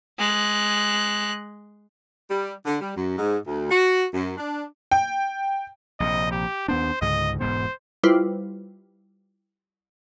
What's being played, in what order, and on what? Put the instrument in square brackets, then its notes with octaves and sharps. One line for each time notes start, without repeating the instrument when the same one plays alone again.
[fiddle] G#3 F#6
[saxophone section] G3
D3
G3
F#2
G#2
D2
F#4
F#2
D4
[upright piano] G5
[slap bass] A#1 C3 [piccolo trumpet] D#5
[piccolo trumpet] G4
[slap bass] D#2 B3 D4 [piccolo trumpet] C5
[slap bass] C#2 G#2 D3 [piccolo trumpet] D#5
[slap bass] E1 G#2 B3 [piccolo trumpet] C5
[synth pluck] G3 E4 F4 B4 C5